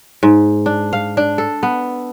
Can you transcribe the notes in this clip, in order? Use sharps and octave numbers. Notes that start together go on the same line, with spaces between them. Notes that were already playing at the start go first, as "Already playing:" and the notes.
G#2
D4
F5
D4
A4
B3